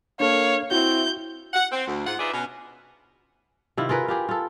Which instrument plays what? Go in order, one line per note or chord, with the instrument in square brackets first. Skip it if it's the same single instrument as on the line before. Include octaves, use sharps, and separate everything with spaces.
[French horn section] A#3 [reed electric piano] D4 A4 [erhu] C#5 [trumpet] F5
[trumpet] C4 [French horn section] E4 [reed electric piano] F#4 [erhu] G6
[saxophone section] F#5
C4
D2
G#2 F4 F#5
D#4 F4 G#4 B4 D5 E5
B2 C#4
[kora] C3 D#3 E4 F4
F4 G#4 A#4 B4
F4 G4 G#4
F4 A4